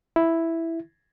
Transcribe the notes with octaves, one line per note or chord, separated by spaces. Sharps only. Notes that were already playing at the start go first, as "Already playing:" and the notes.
E4